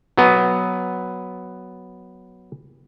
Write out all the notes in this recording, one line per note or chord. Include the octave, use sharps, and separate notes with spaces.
F#3 B3